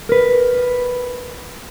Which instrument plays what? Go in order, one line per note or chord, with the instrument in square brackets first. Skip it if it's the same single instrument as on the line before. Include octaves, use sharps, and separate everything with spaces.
[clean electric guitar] A#4 B4